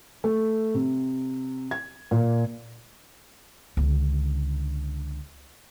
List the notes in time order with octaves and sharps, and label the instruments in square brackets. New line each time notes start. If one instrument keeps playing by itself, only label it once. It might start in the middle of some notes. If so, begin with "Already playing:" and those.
[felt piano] A3
C3
G#6
A#2
[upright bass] C#2 D3